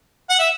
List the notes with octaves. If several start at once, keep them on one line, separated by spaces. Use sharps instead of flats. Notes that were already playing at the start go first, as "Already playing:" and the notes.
F#5
E5